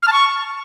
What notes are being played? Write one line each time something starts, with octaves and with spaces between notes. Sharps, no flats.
F6
A5
C#6